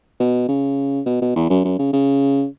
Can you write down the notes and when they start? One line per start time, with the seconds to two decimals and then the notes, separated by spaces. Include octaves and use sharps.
0.20 B2
0.48 C#3
1.06 B2
1.21 B2
1.36 E2
1.50 F#2
1.65 F#2
1.79 C#3
1.93 C#3